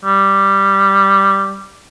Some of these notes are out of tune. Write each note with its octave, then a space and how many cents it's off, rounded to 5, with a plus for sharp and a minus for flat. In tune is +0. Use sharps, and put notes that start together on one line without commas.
G3 +0